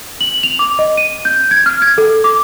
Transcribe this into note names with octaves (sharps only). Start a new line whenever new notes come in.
F#7
F7
D6
D#5
D#7
G6
G#6
F6
G#6
A4
D6